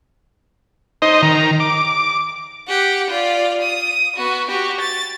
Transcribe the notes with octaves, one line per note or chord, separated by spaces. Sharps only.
D#4 C5 D#5
D#3 A#5
D6
G4 F#5
F4 D5
D#6
B3 F#4
F#4 G4
A6